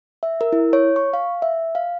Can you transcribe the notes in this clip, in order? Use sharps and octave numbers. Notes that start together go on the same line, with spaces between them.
E5
A#4
E4
C#5
C#6
F5
E5
F5